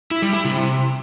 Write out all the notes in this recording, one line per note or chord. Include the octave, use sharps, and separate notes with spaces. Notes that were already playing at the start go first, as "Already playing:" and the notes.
E4
G3
E4
C3